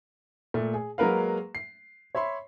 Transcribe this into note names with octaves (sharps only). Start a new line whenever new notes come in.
A#2 A3
G#4
F#3 G#3 A#3 A#4 B4 F5
C7
C#5 E5 B5 C6